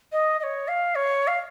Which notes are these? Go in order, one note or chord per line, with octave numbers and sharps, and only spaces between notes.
D#5
D#5
C#5
F5
C#5
F5